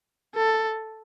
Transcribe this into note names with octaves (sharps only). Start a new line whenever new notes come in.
A4